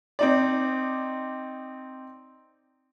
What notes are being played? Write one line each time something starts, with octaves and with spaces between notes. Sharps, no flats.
C4 D#4 D5